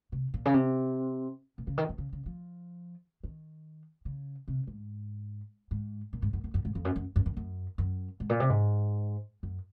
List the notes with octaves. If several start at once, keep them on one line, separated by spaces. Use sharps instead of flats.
C3
A#2
C#3
C3
A#2
C#3
D#3
F3
C#3
C#3
F3
D#3
C#3
C3
G#2
G#2
A#2
G#2
F#2
F#2
F#2
G#2
F2
F#2
F#2
F#2
F#2
F#2
F#2
G#2
A#2
C3
G#2
F#2